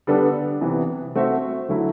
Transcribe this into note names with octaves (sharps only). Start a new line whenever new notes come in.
D3 G3 B3 D4 A4
C3 E3 B3
A3 C4 F#4 C5 E5
D3 F#3 A3 E4